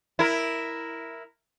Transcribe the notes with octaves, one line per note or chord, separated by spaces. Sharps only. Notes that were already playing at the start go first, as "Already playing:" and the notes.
E4 A#4